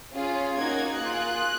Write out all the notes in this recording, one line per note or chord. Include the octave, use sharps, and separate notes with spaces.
C#4 F4 G#4
A#3 D#4 F#4 G#6
A#3 F4 G#4 F#6